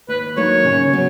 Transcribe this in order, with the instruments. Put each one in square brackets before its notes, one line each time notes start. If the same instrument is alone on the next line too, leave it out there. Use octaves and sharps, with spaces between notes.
[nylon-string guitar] D#2 [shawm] B4
[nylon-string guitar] D#3 F#3 A#3 D#4 [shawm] C#5
[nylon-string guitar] C#3
F#3 B3